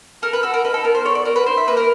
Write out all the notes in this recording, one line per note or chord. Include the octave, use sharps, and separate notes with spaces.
A4 A#4
B4
F#4 A4
A#4
D#4 B4
A4
B3 A#4
C5
A4 C#5
D5
F#4 A#4
B4
D#4 C5
E5
A#3 B4
A#4